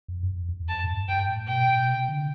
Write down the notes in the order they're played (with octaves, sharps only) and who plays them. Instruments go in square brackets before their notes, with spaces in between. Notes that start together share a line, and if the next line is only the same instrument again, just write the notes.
[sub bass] F2
G2
F2
E2
[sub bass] F2 [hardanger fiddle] A5
[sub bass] A2
G2
[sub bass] G2 [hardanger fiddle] G5
[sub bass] A2
[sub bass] B2 [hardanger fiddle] G5
[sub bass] B2
C3
D3